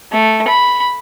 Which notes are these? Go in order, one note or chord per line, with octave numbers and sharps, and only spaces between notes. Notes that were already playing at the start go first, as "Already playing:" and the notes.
A3
B5